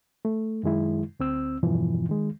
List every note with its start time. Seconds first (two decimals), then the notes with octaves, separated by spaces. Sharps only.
0.25 A3
0.63 F#2 D#3 G#3 E4
1.20 D2 C4 E6
1.63 E2 G2 B2 E3 F3
2.09 D#3 G#3